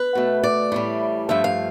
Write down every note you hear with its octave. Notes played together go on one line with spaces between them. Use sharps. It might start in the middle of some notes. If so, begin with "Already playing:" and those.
Already playing: B4
B2 A3
D5
A2 E3 G3
G2 F3 A3 E5
F5